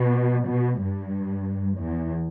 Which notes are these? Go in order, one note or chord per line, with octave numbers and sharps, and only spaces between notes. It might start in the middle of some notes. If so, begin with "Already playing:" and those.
Already playing: B2
B2
G2
E2